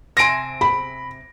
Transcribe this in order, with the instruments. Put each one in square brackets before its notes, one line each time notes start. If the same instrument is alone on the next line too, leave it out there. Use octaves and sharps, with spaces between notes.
[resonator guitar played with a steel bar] C3 C4 G#5 [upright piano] A#6 D7
[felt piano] B5